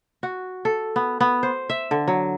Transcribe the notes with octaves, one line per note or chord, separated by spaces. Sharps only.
F#4
A4
B3
B3
C5
E5
D3
F#3